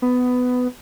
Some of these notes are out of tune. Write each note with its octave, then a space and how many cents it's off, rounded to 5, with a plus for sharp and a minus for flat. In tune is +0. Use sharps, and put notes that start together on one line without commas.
B3 +15